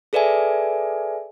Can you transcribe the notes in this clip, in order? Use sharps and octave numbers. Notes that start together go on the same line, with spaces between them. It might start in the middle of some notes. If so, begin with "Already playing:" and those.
G#4 A4 B4 D5 E5 G#5